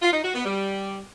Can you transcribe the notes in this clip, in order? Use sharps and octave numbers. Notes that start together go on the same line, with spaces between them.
F4
D#4
F#4
B3
G3